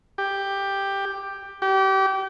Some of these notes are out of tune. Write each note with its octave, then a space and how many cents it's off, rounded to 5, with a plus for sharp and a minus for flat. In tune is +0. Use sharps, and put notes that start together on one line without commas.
G4 +5
G4 -30